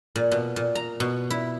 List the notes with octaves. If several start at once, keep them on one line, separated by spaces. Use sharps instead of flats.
A#2
B2
A#2
A#5
B2
E4